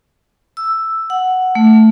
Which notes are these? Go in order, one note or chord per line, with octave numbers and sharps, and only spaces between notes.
E6
F#5
A3